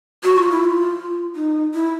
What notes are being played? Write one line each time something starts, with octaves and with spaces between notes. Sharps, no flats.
F#4
F4
E4
F4
D#4
E4